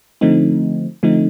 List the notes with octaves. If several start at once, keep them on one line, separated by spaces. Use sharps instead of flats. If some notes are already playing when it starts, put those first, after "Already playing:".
D3 F3 A3 C4 D#4
D3 F3 A3 C4 D#4